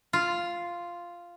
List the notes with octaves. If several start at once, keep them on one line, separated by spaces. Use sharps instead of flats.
F4